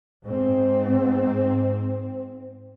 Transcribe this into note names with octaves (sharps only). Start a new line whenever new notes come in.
G#2 C4